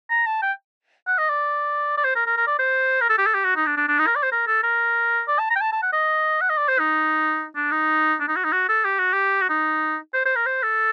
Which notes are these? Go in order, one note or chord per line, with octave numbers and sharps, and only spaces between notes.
A#5
A5
G5
F#5
D#5
D5
D5
C5
A#4
A#4
A#4
D5
C5
A#4
A4
G4
A4
G4
F#4
D#4
D4
D4
D4
D#4
A#4
D5
C5
A#4
A4
A#4
D5
A5
A#5
G5
A5
A5
F#5
D#5
F#5
D#5
D5
C5
D#4
D4
D#4
D4
D#4
F#4
D#4
F#4
A4
G4
F#4
G4
F#4
D#4
C5
C5
A#4
C5
A4